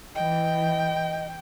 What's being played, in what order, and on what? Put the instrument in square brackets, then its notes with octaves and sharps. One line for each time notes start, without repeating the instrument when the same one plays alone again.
[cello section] E3 [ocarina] D#5 [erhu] G5